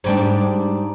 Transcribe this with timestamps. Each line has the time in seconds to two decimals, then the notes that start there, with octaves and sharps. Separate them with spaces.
0.04 G#2 G3 D4